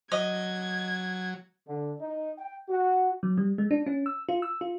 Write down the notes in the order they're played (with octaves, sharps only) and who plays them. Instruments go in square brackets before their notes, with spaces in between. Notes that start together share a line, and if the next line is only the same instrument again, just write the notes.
[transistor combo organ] F#3 [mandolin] D#5 [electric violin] G#6
[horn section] D3
D#4
G5
F#4
[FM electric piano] F#3
G3
G#3
D4
C#4
E6
F4
E6
F4